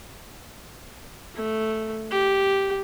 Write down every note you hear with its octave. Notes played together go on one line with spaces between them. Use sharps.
A3
G4